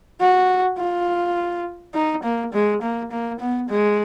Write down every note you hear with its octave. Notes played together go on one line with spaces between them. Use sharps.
F#4
F4
D#4
A#3
G#3
A#3
A#3
B3
G#3